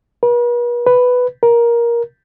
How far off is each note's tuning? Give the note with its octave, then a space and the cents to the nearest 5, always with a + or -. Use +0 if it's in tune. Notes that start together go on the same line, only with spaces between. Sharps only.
B4 -45
B4 +5
A#4 +15